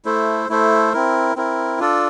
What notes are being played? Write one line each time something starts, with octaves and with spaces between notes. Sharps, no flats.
A3 E4 A4 C5
A3 E4 A4 C5
C4 E4 A#4
C4 E4 A#4
D4 F4 A4 D5